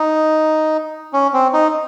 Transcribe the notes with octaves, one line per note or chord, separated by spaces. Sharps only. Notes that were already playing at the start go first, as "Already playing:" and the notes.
Already playing: D#4
C#4
C4
D#4